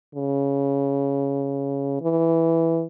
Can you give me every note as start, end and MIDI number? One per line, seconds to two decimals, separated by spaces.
0.15 1.96 49
2.01 2.85 52